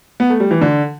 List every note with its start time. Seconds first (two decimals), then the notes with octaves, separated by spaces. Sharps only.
0.20 B3
0.30 A3
0.40 G3
0.51 E3
0.61 D3